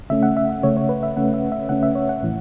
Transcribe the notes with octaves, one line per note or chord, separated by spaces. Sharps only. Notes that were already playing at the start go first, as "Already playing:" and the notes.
C#3 A3 C#4 E5
F#5
E5
E5
C#3 A3 C#4 C#5
C#5
B4
E5
C#3 A3 C#4 F#5
E5
E5
C#3 A3 C#4 F#5
E5
C#5
F#5
A2 E3